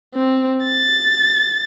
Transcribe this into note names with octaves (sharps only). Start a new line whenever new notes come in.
C4
A6